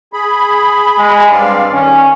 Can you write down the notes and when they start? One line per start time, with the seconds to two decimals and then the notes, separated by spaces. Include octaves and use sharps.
0.13 G#4 B5
0.98 G#3
1.31 G2 C4 D5 F5
1.71 D#3 C#4